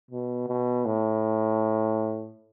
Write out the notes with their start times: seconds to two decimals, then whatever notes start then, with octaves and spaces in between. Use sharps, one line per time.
0.11 B2
0.48 B2
0.86 A2